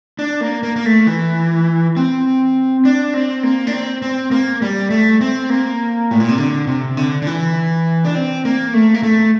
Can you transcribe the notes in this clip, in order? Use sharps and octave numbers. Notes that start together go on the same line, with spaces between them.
D4
A#3
A#3
A#3
A3
E3
C4
D4
C4
A#3
D4
C4
C4
A#3
G3
A3
C4
A#3
A2
A#2
C3
D3
C3
D3
D3
E3
D4
C4
A#3
A3
A#3
A3